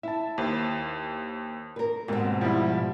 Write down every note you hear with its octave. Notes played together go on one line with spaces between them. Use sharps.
E4 E5 A5
D#2 C5
A#4 B4
D#2 G#2 B2 C4
F3 G3 E4